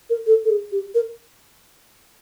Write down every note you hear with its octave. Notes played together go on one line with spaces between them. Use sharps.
A#4
A4
A4
G#4
G4
A#4